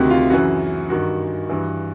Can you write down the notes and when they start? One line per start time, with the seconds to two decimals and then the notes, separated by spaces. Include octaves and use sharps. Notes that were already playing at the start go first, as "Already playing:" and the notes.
Already playing: D2 C3 D#3 F#4 G4
0.10 F4
0.30 F#2 C#3 E3 F#4
0.89 G2 D#3 F#4
1.49 G2 E3